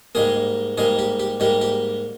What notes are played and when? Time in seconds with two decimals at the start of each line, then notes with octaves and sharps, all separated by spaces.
0.15 G#2 G3 A#3 G#4
0.78 G#2 G3 A#3 G#4
0.99 G4
1.20 G4
1.40 G#2 G3 A#3 G4
1.61 G4